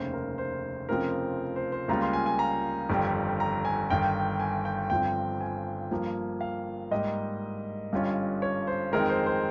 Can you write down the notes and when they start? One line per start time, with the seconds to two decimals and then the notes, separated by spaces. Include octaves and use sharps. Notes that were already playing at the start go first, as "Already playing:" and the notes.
Already playing: F1 D#2 C#3 C5
0.13 A#4
0.38 C5
0.89 F1 F2 C#3 F3 C4 A#4
1.56 C5
1.72 C5
1.88 C#2 C#3 G3 A#3 F4 A#5
2.02 C6
2.13 G#5
2.26 G#5
2.39 A#5
2.89 G1 F2 D#3 G3
3.40 A#5
3.65 G#5
3.90 G1 G2 D#3 G5
4.40 G#5
4.65 G5
4.90 G1 G2 F3 C4 G5
5.41 G#5
5.91 G2 F3 A#3
6.41 F5
6.91 G#2 G3 A#3 D#5
7.92 G1 G2 G3 C#4 F4
8.42 C#5
8.67 C5
8.92 F2 D#3 G#3 C4 D#4 A#4
9.10 C5
9.27 C5